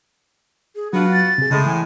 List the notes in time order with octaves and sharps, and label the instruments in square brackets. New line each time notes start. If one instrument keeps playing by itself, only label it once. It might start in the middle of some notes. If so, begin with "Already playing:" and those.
[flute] G#4
[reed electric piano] F#3 [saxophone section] B3 F4 F#4 [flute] D4
[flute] A6
[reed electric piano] C3 G#4
[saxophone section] A2 G#3 [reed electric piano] C#3
[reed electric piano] E3 [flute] G#5